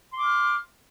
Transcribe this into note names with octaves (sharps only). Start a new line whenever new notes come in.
C6 D6 F6